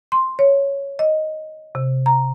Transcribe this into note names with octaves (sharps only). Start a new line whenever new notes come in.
C6
C#5
D#5
C3
A#5